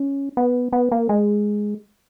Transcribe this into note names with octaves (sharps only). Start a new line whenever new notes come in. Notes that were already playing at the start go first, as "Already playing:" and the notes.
Already playing: C#4
B3
B3
A#3
G#3